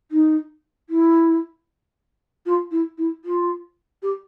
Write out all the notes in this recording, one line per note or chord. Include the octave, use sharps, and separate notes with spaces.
D#4
E4
F4
E4
E4
F4
G4